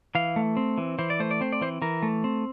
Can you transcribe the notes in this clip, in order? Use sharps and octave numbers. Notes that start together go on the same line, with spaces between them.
E3 F5
A3
C4
E3
E3 C5
D5
A3 C5
D5
C4 C5
D5
E3 C5
E3 A#4
A3
C4